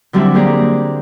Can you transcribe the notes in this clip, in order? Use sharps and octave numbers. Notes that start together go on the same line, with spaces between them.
D3 F#3 G3 C4 D4 E4
A#3 G4 G#4 D5 A#5